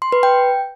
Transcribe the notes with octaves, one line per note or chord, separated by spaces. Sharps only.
C6
B4
G5